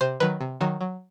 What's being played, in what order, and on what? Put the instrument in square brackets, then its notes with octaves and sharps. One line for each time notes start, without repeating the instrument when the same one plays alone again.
[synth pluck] C3 C5
D#3 F#3 B4
C3
D#3 F#3
F#3